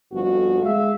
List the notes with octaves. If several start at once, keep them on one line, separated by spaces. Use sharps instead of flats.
G1 F2 F3 F#4
G#3 E5 F5